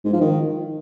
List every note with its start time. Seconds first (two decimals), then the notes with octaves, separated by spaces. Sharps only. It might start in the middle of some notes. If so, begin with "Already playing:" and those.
0.05 G#2
0.13 F3
0.21 D#3